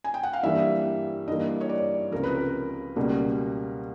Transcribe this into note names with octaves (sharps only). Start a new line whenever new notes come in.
G#5
G5
F#5
F5
G2 E3 G3 A#3 E5
G2 E3 G3 A#3 D#5
C#5
D5
C#2 C3 F3 A#4
B4
A#4
C#2 B2 G3 A#3